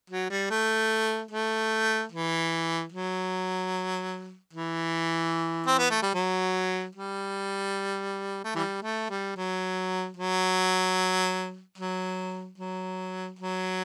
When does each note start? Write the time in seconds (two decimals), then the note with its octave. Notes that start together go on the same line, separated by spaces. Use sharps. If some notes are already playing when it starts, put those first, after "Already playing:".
0.10 F#3
0.30 G3
0.50 A3
1.31 A3
2.12 E3
2.92 F#3
4.53 E3
5.66 C4
5.78 B3
5.90 A3
6.02 G3
6.14 F#3
6.95 G3
8.44 A3
8.55 E3 G3
8.82 A3
9.09 G3
9.36 F#3
10.17 F#3
11.78 F#3
12.58 F#3
13.39 F#3